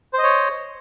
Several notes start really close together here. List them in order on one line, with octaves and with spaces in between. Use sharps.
C5 D#5 C#5